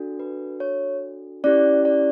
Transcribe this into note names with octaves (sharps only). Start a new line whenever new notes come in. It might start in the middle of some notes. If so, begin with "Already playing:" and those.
Already playing: D4 F#4 A4
B4
C#5
C#4 E4 G4 D5
D5